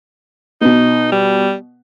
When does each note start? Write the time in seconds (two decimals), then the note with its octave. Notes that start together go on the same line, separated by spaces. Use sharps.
0.61 B2 B3 D#4
1.12 G3